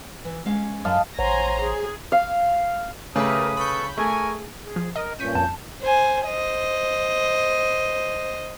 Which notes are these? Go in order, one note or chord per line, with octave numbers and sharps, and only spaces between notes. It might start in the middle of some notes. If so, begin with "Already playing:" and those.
E3
G#3 C#4 F5
F#2 D#5 F5 A5
A1 C5 C#5 F#5 G#5 A#5 C6
G#4
F5
C#3 A3 G4 A#4 B4 D#6
A4 B4 B5 C#6 G6
A3 G#4 A#4 G#5 C#6
G#4
F3
A#4 D#5
G2 A#2 C#4 C#6 G6 B6 D#7
F2 A5
C5 G#5
C5 D#5